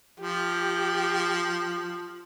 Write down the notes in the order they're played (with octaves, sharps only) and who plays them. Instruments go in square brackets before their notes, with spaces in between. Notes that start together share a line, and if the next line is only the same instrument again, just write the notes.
[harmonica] F3 [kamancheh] G4